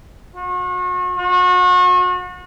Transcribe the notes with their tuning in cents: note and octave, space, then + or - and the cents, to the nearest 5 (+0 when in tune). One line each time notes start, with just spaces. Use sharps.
F#4 -40
F#4 -35